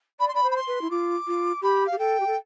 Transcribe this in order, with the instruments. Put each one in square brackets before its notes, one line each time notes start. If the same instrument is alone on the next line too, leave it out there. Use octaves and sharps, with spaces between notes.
[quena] D5 [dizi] B5
[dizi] C6
[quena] D5 [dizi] B5
[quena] C5
[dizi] B5
C6
[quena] B4
E4
[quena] F4 [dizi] D6
[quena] F4
[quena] G4 [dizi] B5
[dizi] F5
[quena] G4
[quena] A4 [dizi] G5
[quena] G4
A4